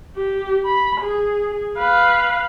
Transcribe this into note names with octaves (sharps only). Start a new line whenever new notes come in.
G4
B5
G#4
B4 F5